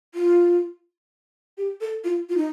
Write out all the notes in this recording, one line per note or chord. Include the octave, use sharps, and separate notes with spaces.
F4
G4
A4
F4
F4
D#4